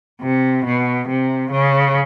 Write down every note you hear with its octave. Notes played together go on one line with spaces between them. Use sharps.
C3
B2
C3
C#3